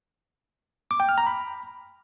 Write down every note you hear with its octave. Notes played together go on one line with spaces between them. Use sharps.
D6
G5
F6
A#5
B5